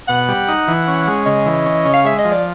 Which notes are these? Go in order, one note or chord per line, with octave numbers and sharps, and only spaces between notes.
B2 F#5
G3
D#4
E3
C#4
G#3
C#3 D#5
E3
C#4
C#3
F5
G#3 E5
D#5
F3
D5